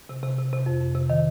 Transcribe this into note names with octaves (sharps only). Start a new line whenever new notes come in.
C3
C3
C3
C3
F2
F2
C3
D#3